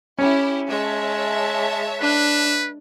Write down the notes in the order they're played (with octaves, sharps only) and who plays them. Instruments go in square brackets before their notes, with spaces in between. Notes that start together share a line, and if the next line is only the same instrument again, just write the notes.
[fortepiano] C#4 [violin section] E4 G4
[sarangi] G#3 [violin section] C#5 E5 A5
[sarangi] D4 [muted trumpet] B4